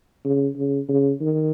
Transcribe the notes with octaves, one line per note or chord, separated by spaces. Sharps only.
C#3
C#3
C#3
D#3